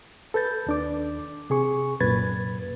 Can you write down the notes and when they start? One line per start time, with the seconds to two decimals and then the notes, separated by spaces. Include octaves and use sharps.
0.34 A4 B4 G6 A6
0.67 D#2 D4 D6
1.50 C3 G#4 C#6
2.00 C2 F#2 A#2 B4 G#6 A6